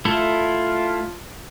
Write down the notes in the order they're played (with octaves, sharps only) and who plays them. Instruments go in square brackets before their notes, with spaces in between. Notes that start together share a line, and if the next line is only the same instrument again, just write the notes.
[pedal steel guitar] A3 E4 A4 [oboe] F4